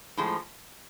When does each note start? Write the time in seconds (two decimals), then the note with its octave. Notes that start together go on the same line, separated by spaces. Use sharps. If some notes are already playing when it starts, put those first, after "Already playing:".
0.17 A2 F3 G#3